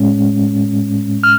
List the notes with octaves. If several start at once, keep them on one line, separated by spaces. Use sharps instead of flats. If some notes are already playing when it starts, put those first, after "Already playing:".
Already playing: A2 G#3 C#4
F6